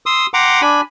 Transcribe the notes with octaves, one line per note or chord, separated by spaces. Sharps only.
C6 D#6 E6
F#5 G5 A#5 C6 D6
D4 G#5 B5